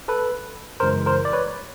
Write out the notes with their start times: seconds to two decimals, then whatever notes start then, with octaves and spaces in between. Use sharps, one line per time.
0.08 A4 B4
0.80 F#2 C#3 E3 G#3 A#4 C5
1.06 A#4 C5
1.25 D5
1.33 B4 C#5